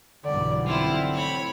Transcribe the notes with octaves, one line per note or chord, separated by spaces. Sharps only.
B1 G2 D3 E3 D5
C4 E4 F4
A2 C#5 B5